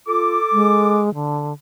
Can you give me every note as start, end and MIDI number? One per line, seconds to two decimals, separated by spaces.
0.07 0.38 65
0.07 1.01 69
0.07 1.01 86
0.52 1.13 56
1.14 1.53 50